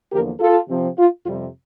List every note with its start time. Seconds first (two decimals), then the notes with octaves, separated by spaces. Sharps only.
0.11 E2 D3 F3 A#3 G4 A#4
0.40 F4 A4
0.69 C3 F3 C4
0.98 F4
1.25 F2 C3 G3 F4